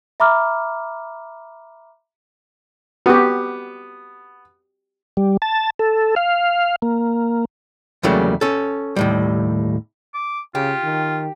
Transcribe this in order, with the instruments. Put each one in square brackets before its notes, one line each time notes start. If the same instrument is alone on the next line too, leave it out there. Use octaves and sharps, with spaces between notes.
[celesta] E5 A#5 B5 D6 F6
[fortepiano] B3 [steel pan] F#4 G4
[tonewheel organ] G3
A5
A4
F5
A#3
[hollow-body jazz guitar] E2 C#3 F#3 G3 A3 A#3
C#4 A4
D#2 A2 G3
[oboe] D6
[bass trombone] C#3 [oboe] F4 [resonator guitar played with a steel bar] G4
[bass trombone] D#3